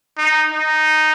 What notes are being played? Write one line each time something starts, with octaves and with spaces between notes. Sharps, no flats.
D#4
D#4